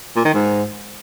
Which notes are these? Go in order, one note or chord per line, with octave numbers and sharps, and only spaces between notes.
A#2
D#3
G#2